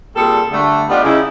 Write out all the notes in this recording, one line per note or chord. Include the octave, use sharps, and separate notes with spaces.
A#2 G3 C4 G#4 A4
D3 G3 A3
G3 B3 D4 D#4 F4 G4
C#3 D#4 E4